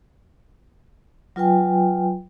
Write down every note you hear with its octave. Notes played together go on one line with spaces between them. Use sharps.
F#3 F4 B4 G5 G#5